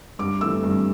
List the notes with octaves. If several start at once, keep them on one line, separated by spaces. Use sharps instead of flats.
G2 D6
E3 A3 E6
G2